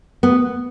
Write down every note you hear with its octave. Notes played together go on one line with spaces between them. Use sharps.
B3